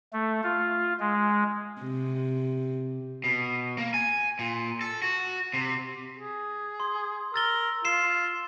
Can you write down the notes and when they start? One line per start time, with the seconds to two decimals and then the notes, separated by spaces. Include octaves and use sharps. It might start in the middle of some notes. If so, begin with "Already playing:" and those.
0.13 A3
0.43 F4
1.00 G#3
1.82 C3
3.24 B2
3.78 A#3
3.94 G#5
4.39 A#2
4.81 A4
5.02 F#4
5.54 C3
6.19 G#4
6.80 C6
7.34 A#4 E6 A6 G7
7.85 F4 C7 E7